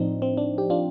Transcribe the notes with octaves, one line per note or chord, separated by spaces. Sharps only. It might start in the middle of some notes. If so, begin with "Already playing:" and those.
Already playing: A2 F3 C4 D4 D#4
C4
D4
G4
D4 F4